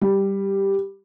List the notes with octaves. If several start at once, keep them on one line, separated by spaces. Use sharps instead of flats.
G3